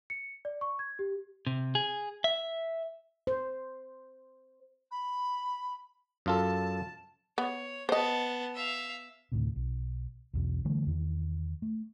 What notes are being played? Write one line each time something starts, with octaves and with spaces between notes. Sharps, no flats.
C#7
D5
C#6
G#6
G4
C3
G#4
E5
C5
B5
F#2 F4 A4 A5
B3 C#5
B3 C5 D#5 A5
E5 F5
D2 A2 C3
B1
B1 E2 B2
D3 E3 G3 A3
E2 D#3
A3